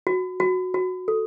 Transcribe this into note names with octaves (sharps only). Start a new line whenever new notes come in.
F#4
F#4
F#4
A4